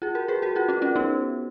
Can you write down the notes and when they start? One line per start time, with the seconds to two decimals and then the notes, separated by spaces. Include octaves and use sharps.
0.02 F4 G#4
0.15 F#4 A#4
0.28 G#4 B4
0.42 F#4 A#4
0.55 F4 G#4
0.68 C#4 F4
0.82 C#4 F4
0.96 B3 D#4